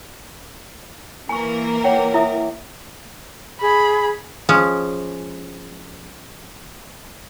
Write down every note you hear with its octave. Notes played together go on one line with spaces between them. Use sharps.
E3 A#3 A#4 G#5 C#6
C#5 F#5 G5
E4 E5 D#6
G#4 B5
F3 G#3 C#4